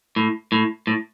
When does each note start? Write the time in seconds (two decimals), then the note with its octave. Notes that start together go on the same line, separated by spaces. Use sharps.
0.16 A2
0.52 A2
0.87 A2